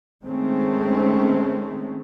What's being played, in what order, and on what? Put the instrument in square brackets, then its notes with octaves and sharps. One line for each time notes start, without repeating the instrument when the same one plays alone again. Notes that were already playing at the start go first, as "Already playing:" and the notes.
[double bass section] D#3 G#3 A3 C4 C#4